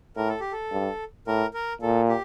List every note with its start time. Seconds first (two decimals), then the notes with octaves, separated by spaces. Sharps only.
0.17 A2 A#4
0.28 A4
0.40 G4
0.52 A4
0.72 G2
1.27 A2 A#4
1.54 A#4
1.81 A#2 A4
2.09 G4